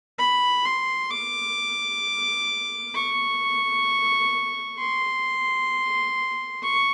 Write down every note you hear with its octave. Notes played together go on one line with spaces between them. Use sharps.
B5
C6
D6
C#6
C6
C#6